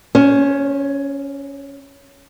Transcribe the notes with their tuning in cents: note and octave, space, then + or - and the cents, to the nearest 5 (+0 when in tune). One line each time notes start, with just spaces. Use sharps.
C#4 +10 C5 +45